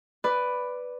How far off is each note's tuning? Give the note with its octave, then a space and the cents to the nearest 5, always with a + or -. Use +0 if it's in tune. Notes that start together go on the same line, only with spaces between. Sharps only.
B4 +5 D5 +0